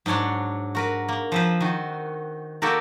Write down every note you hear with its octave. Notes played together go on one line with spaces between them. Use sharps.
G#2 F#3 D4 C#5 F#5
F#4 A#4 B4
A#3
F3 C4 B4
D#3 F#4
A#3 D#4 F#4 G4 A4 A#4